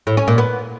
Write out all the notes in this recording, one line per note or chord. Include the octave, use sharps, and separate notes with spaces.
A2
C#4
A#2
B3